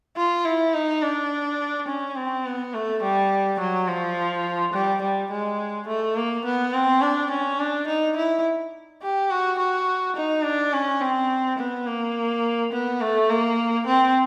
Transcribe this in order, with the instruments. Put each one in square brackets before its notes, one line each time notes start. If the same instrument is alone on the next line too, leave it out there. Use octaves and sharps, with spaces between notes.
[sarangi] F4
E4
D#4
D4
C#4
C4
B3
A3
G3
F#3
F3
G3
G3
G#3
A3
A#3
B3
C4
D4
C#4
D4
D#4
E4
G4
F#4
F#4
D#4
D4
C#4
C4
B3
A#3
B3
A3
A#3
C4